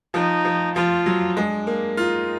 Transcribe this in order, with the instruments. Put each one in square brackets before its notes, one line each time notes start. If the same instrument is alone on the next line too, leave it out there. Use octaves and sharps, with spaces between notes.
[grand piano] F3 [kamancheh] D#4
[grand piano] F3
[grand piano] F3 [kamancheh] F4
[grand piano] F#3
[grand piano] G#3 [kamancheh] D4
[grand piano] A#3
[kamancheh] D#4 [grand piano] F4